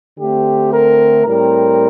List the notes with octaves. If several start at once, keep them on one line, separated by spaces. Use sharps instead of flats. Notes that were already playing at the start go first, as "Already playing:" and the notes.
D3 A3 C4 G4
A#4
A2 G3 C4 A#4